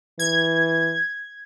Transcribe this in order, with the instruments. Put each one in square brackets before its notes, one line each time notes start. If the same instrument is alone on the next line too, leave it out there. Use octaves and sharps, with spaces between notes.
[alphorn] E3 [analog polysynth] G#6